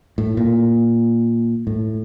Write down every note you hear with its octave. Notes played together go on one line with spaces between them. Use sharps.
A2
A#2
A2